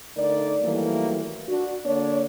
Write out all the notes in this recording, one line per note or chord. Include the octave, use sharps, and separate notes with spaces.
D3 A3 D#4 A#4 D5
D#3 E3 F#3 G3 A3 A#3
D4 F#4
D3 A#3 D4 C#5